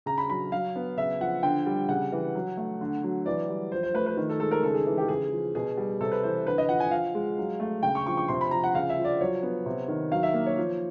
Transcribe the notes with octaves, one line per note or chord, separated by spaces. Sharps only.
C#3 A#5
B5
F#3 B5
F#3 F5
B3
C#3 E5
F3 F#5
D3 G5
G3
C#3 F#5
E3
F#3
A3
D3
F#3
E3 D5
G3
F3 C5
C5
A3 B4
B4
D#3
A4
G#3 A4
A#4
C#3 A4
G#4
E3
G4
C#3 G#4
F3
B2 G#4
G3
C3 A4
B4
E3 C5
D3 B4
D#5
F3 F#5
G#5
F3 F5
G#3
F#3
A3
C#3 G5
C#6
F3 C#6
C#6
C3 C6
B5
F3 A#5
F#5
C#3 F5
E5
F3
D5
F#3 C#5
B3
C3
D#3
F#3 F5
E5
A#3
C#5
F3